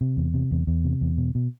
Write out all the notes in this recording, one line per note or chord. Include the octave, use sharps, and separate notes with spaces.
C3
E2
C3
E2
E2
C3
E2
B2
B2